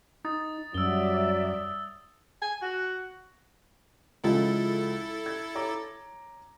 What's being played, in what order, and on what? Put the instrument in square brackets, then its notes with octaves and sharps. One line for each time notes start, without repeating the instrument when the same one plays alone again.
[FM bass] D#4 [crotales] D#6 A6
[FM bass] F#2 [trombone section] F#3 [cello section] G3 D5 E5 [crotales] E6 G7
[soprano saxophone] G#5
F#4
[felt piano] C#2 F3 G#3 [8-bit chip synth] E4 A4 A6
[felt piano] G#6
C#5 A#5 D6